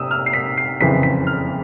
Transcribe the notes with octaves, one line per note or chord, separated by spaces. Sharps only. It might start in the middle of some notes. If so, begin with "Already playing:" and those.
Already playing: C3 D#6 E6
F6
C7
B6
C7
F#1 F2 C#3 E3 B6
B6
F6